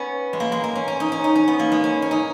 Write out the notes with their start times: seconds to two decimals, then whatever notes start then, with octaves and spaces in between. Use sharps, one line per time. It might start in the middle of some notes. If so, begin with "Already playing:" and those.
Already playing: B3 C#4
0.33 G#3
0.40 A#3
0.52 G#3
0.64 A#3
0.75 C#4
0.88 C#4
1.00 D#4
1.12 C#4
1.24 D#4
1.35 C#4
1.48 B3
1.59 A#3
1.72 G#3
1.84 C#4
2.02 C#4
2.11 D#4